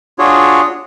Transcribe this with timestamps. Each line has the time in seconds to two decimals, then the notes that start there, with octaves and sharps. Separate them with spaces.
0.19 D4 F4 F#4 G#4 C#5